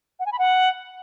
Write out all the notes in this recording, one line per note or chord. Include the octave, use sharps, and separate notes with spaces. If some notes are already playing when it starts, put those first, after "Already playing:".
F#5
G#5
B5
F#5